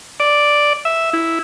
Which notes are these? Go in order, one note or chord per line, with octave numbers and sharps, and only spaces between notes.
D5
E5
E4